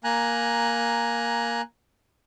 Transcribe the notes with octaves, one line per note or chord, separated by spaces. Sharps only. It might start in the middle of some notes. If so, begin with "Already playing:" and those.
A#3 G#5 A#5 F#6